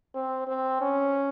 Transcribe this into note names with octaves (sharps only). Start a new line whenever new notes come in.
C4
C4
C#4